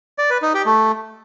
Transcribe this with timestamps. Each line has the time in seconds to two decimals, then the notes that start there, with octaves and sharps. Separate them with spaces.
0.18 D5
0.30 B4
0.42 D#4
0.54 G4
0.66 A3